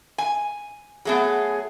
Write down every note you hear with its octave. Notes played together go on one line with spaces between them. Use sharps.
G#5
F#3 A3 B3 G#4